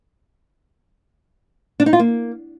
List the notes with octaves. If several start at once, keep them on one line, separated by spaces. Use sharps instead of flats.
D4
D#4
F4
A#3